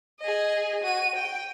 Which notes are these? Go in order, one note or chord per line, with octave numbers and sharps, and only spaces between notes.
G#4 D#5
F#4 D#7
G5